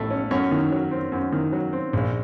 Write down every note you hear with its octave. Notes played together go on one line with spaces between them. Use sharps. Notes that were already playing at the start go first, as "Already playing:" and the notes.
Already playing: A1 A2 A3
C#4
F#2 C#4 C#5
D#3
F#3
C4
F#2
D#3
F#3
C4
A#1